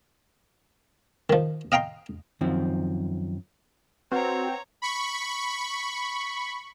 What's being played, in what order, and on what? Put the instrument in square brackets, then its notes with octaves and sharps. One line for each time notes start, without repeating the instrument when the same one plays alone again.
[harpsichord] D#3 F3
D#5 F5 G5 A#5 C6
[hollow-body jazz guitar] F#2 D#3 F3 C4
[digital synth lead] C4 [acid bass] F#4 [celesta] B4 F#5 [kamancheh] C#5 A#5
[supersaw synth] B5 C#6